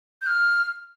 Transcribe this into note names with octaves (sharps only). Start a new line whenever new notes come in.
G6
F6